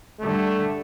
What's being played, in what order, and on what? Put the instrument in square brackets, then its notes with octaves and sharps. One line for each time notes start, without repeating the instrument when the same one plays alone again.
[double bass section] D3 G3 [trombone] A3